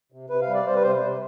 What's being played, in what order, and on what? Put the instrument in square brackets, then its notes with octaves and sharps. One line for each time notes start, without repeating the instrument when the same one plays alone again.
[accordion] C3
C3 B4
F5
G3
D5
G3 C5
B4
C3 C5
C3